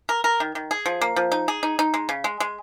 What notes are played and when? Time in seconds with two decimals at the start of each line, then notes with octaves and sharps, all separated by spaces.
0.09 A#4
0.24 A#4
0.40 D#3
0.55 D#3
0.71 G#4
0.86 F3
1.01 A#3
1.16 F3
1.32 D#4
1.48 G#4
1.63 D#4
1.79 D#4
1.94 G#3
2.09 C#3
2.24 G#3
2.40 G#3